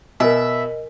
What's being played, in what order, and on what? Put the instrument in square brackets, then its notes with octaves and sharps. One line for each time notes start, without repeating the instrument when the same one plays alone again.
[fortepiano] B2 [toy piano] A#4 G#5 [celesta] D#5 [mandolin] E5